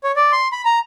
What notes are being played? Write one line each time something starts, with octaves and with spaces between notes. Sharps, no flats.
C#5
D5
C6
B5
A#5